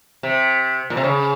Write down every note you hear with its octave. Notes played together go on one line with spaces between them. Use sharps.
C3
A#2
C3
C#3